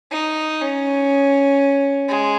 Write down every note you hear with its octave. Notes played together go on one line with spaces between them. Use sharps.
D#4
C#4
G#3